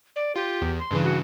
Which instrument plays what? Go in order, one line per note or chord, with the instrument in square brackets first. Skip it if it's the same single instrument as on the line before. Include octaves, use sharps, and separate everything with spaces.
[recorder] D5
[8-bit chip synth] F4 [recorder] G4
[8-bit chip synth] E2
[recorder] C6
[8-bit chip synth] G2 C#3 E3
[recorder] F#4